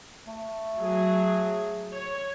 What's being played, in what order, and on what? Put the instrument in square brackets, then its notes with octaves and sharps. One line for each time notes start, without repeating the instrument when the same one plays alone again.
[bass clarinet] A3
[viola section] F#3 G#4
C#5